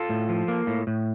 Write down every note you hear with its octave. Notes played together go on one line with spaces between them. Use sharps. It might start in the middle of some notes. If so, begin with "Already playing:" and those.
Already playing: F4 A4
A2
F3
A#3
A2
A2